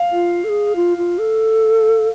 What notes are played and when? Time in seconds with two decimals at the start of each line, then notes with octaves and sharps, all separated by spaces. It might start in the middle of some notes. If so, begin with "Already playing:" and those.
Already playing: F5
0.12 F4
0.44 A4
0.49 G#4
0.76 F4
0.97 F4
1.18 A4